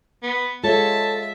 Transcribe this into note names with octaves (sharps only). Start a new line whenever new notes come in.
B3
G#3 F4 A4 C#5 E5 A5